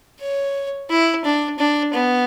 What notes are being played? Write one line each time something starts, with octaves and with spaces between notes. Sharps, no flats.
C#5
E4
D4
D4
B3